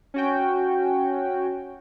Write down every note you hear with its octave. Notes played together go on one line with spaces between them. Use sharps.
C#4 F#4 G5